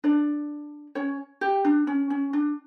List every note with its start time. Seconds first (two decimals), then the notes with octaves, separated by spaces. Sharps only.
0.04 D4 D5
0.95 C#4 C#5
1.41 G4
1.65 D4
1.87 C#4
2.10 C#4
2.33 D4